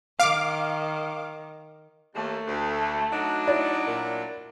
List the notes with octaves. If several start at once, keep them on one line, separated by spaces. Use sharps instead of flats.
D#3 F5 D6
D#2 A3
D2
F#3 D4 D#4
E4 C#5 D5
A#2